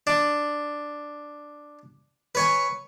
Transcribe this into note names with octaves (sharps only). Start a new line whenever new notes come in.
D4
B4 C#5 G#5